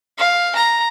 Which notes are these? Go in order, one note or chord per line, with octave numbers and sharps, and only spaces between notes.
F5
A#5